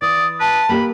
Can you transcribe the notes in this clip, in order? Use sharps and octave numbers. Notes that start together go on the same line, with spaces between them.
E3 D5 D#6
B4 A5
A#3 G4 A#4 B5